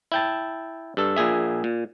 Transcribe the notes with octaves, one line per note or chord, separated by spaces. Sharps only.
E4 G5 A5
G2 A4
A#1 A#2 G#4 E5
A#2